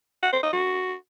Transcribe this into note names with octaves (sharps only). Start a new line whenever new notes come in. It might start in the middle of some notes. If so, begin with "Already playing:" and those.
F#5
C5
D#5
F#4